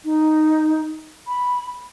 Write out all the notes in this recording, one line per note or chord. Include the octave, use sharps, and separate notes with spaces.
D#4
B5